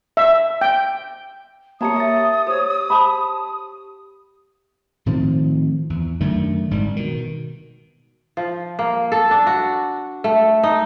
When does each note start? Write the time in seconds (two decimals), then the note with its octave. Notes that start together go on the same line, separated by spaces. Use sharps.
0.17 E5
0.61 G5
1.81 A#3 G4 C#5 A5 A#5 D#6 C#7
1.96 E5 A6
2.47 G4 C5 C#5
2.90 C5 A5 B5
5.06 A2 D#3 F3 C4
5.90 E2
6.21 F#2 D3 D#3 A3
6.71 G#1 G#2 G3
6.96 B2 D#3
8.37 F3
8.79 A#3
9.12 A4
9.31 D4
9.47 F#4
10.24 A3
10.64 D#4